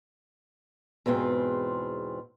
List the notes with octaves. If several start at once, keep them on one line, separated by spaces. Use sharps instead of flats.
E2 G#2 B2 C4 F4